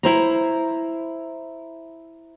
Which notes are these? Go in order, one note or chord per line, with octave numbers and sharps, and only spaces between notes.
E4 C5 A#5